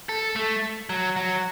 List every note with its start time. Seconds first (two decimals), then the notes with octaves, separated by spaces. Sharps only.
0.09 A4
0.36 A3
0.89 F#3
1.16 F#3